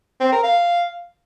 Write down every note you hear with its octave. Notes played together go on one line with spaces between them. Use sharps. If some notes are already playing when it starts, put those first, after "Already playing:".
C4
A#4
F5